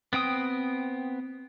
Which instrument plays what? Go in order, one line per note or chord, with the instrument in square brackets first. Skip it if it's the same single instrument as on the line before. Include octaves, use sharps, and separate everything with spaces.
[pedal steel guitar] B3 C4 G5 D#6